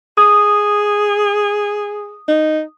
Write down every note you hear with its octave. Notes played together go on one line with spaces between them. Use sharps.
G#4 D#6
D#4